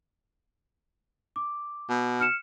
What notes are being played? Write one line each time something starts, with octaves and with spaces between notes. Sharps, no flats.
D6
B2
F6 C#7 E7